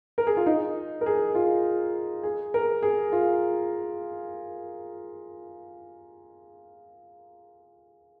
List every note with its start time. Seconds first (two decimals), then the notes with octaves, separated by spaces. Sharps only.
0.18 A#4
0.27 G#4
0.37 F4
0.46 D#4
1.01 A#4
1.06 G#4
1.35 F4
2.23 G#4
2.54 A#4
2.83 G#4
3.12 F4